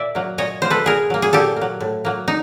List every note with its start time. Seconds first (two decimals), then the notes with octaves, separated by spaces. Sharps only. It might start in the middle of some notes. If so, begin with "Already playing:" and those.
Already playing: A#2 D5 E5
0.15 F#3 A#3
0.38 A#2 C#5 D#5
0.62 F#3 A#3 C5
0.70 A4 B4
0.84 A#2 G#4 A#4
1.10 F#3 A#3
1.22 G#4
1.33 A#2 G4 A4
1.56 A#3
1.61 F#3
1.80 A2
2.05 F#3 A#3
2.28 D#4